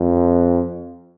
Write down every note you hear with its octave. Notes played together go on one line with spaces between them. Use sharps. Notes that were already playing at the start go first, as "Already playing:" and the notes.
Already playing: F2